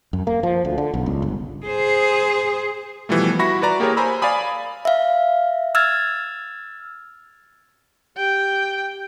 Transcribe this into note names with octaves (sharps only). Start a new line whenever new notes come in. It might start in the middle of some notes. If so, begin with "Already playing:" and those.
F#2
A#3
F3
D2
D3
B1
C#2
G1
G#4 C5
B2 E3 F3 G3 A3
E4 F#4 B5 C#6 A#6
F#4 B4 D5 A#5
A#3 G4 G#4 A#4 C#5
C5 G#5 A#5 B5 E6
D5 F5 G#5 B5 D#6
E5 F5
E6 F6 G#6 A6
G4 G5